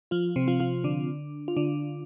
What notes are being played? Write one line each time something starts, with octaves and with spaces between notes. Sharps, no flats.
F3 F4
C3 C4
F3 F4
F3 F4
D3 D4
F4
D3 D4